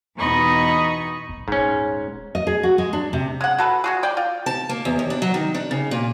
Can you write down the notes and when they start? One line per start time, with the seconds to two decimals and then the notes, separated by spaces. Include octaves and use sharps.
0.17 E2 B2 D#4 D#5 B5 C#6
1.29 D1
1.48 D#1 G#2 C#4
2.35 D#5
2.47 G#4
2.63 F#4
2.78 G#3
2.93 D4
3.13 C3
3.41 G#3 F#5
3.58 F#4 A4 B4
3.84 G#3 F#4 G#4
4.03 D5 G5
4.17 F4
4.46 A5
4.69 A#3
4.85 E2
4.99 D#2
5.10 D4
5.22 F#3
5.34 D#3
5.54 D4
5.71 C#3
5.91 A#2